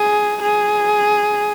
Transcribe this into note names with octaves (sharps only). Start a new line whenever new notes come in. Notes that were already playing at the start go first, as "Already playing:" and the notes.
Already playing: G#4
G#4